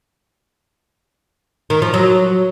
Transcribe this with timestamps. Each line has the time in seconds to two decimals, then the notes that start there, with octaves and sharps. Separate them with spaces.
1.70 D#3
1.82 F3
1.94 F#3